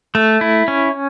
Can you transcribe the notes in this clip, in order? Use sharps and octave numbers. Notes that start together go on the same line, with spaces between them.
A3
E4
C#4